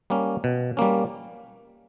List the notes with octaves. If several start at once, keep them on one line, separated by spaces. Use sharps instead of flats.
G3 A#3 C#4
B2
G3 A#3 C#4